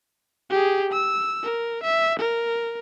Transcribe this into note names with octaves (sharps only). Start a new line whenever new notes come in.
G4 G#4
E6
A#4
E5
A#4